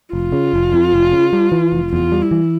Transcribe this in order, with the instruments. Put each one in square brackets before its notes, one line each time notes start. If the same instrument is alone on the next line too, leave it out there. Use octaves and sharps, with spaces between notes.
[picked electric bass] F1 [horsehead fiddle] F4
[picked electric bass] C#3
F1
F2
F1
C#3
G3
E3
F1
[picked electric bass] E2 [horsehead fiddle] F4
[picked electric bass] G3
[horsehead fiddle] E4
[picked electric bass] E3